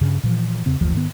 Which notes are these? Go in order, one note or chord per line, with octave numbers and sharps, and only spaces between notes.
G2 C#3
A#2 E3 F3
E2 C#3 C4
F#1 D2 E3 F3
G#2 D#3 A3 B3